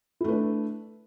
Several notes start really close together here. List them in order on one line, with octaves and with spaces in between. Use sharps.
E4 A3 B4 D4